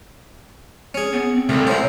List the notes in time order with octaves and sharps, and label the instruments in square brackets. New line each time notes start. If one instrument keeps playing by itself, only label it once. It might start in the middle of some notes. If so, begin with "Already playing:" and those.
[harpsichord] C#4 G#4
[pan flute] B3
C4
[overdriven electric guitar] C2 [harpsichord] A3
[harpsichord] E4 C5 [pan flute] C#5